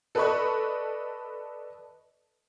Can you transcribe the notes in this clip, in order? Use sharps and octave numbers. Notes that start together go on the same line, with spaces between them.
A4 B4 D5 D#5 B5 C#6